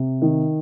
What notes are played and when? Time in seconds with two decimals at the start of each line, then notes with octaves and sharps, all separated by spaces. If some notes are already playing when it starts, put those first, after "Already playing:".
Already playing: C3
0.22 D#3